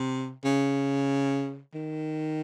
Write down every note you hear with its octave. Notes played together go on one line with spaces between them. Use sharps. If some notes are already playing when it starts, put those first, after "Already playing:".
Already playing: C3
C#3
D#3